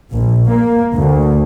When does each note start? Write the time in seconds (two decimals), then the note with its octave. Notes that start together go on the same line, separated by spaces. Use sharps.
0.12 A#1
0.49 A#3
0.94 D2